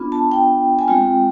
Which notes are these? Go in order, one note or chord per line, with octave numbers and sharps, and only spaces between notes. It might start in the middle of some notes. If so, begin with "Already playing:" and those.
Already playing: B3 D4 F4
A5
G5
G#5
G#3 C4 F4 G5